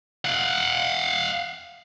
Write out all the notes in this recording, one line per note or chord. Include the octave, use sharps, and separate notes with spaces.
F5 F#5